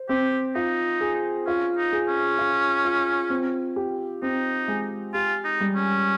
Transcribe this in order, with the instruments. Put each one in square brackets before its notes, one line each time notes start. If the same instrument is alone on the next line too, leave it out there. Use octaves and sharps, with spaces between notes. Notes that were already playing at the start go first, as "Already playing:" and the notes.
Already playing: [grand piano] C5
[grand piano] C4 [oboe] G4
[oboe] D#4 [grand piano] F4
[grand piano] G#4
[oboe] C#4 [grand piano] F4
[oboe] D#4
[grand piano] G#4
[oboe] C#4
[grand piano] F4
F4
C4
G4
[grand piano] C4 [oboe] D#4
[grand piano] G#3
[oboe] F4 [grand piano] G4
[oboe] D#4
[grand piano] G3
[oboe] C#4